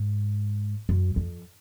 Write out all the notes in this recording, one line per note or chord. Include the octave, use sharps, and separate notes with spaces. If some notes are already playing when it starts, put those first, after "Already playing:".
Already playing: G#2
F#2
F2